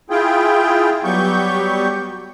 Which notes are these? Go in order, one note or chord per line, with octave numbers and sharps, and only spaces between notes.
E4 F4 G#4 G5
F#3 G3 B3 G4 C#6 G6